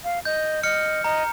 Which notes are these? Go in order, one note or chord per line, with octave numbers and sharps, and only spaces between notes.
F5
D#5 G6
D#5 F6 C#7
D#5 A#5